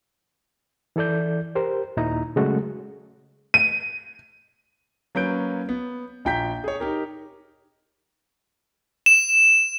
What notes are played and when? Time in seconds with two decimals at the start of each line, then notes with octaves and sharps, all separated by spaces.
0.96 E3 E4 A4 D5 G6
1.55 G4 A#4 C5
1.97 D#2 A#2 D#4 E4 A#5
2.36 C#3 F#3 G#3 A3 F#4 A4
3.54 D#7
5.15 F#3 A#3 C#4 B4 G6 D7
5.69 B3
6.25 A#1 F4 G5 A#5 G6 B6
6.64 G#4 C#5
6.80 D#4 G4 A#4
9.06 E7